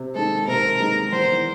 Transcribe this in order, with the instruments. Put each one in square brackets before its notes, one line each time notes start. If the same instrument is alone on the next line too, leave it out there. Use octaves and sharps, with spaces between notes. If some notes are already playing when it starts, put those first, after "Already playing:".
Already playing: [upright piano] C3
[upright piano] D#3 G#3 [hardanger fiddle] A4
[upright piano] C3 [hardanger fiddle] A#4
[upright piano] D#3 G#3
[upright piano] E2 [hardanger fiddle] C5